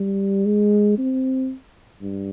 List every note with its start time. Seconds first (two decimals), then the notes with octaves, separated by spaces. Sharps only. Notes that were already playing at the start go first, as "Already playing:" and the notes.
Already playing: G3
0.46 G#3
0.98 C4
2.02 G2